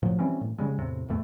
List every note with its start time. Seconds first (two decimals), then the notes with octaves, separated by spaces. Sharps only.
0.03 A2 F3 F#3
0.19 E3 G3 C4 C#4
0.41 A2
0.58 C#3 G3 G#3
0.78 E2 A2 C3
1.08 D1 E2 A2 A3